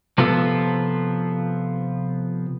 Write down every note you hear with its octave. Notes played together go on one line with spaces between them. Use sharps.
C3 F3 B3 F4 A4